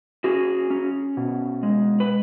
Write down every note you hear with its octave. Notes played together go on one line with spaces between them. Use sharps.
C#4 F#4 G#4
C#4
B2
G#3
B4